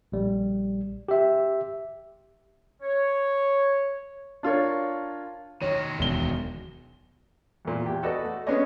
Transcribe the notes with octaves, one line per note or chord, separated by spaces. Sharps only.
A#1 G3
G4 E5
C#5
D4 F4 A#4 C#5
D#3 F#3 C#5
E1 G7
E2 A#2
E2 G4
F#4 A4 B4 D5 D#5
A3
B3 C#4 D4 G#4 C#5 D#5